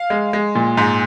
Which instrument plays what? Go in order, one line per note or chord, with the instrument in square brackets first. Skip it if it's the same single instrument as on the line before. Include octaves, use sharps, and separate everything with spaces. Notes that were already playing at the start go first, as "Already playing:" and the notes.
Already playing: [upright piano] F5
G#3
G#3
A#2
G#2